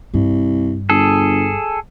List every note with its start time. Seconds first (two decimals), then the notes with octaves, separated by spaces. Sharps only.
0.14 C2 G2
0.90 G1 G#4 A4